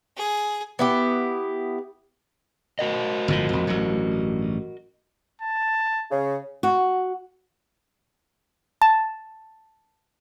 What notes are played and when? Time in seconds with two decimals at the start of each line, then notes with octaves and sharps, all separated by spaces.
0.17 G#4
0.79 B3 E4 G4
2.79 F#4 A#4 D#5
3.28 G1 A2 F3
3.49 A#1 F2
3.67 A1 G2 F#3
5.41 A5
6.11 C#3
6.63 F#4
8.82 A5